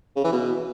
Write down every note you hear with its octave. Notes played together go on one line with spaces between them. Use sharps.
C#3
E3
B2